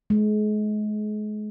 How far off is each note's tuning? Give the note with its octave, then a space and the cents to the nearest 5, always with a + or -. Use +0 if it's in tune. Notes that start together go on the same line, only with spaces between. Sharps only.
G#3 +35